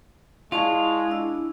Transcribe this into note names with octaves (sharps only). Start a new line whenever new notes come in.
G#3 E4 F4 D5 A5 C#6
D4 E6